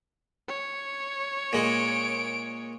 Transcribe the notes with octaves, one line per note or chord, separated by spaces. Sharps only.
C#5
A#2 G#3 D7